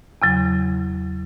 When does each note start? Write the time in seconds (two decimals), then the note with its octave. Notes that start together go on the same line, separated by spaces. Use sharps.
0.22 E2 C#3 F#3